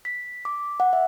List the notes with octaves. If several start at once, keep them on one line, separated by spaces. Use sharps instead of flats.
B6
D6
F#5
E5